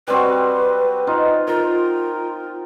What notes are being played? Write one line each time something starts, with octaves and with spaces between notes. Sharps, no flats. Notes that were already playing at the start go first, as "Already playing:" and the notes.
G3 C4 F#4 B4
D#4 F4
F4 A#4